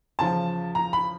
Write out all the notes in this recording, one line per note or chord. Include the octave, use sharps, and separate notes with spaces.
E2 C#3 F3 A5
A#5
B5